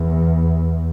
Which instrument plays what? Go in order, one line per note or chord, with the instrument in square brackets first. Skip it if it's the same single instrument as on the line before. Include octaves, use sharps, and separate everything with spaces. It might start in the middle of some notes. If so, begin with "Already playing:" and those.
Already playing: [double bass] E2